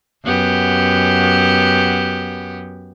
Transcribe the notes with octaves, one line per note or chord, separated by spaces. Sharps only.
F#2 B3 G4